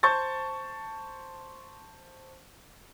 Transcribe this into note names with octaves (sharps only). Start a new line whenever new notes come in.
C5 A5 C#6 G6 A6